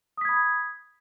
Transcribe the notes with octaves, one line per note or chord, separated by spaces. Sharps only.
B5 D#6 G#6 B6